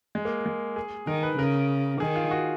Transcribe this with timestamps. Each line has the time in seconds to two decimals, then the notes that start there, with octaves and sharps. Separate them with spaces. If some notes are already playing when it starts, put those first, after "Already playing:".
0.15 G#3
0.25 A#3
0.46 G#3
0.76 G#4
1.07 D#3 A#4
1.23 B4
1.38 C#3 A#4
2.00 D#3 G#4
2.16 F4
2.31 F#4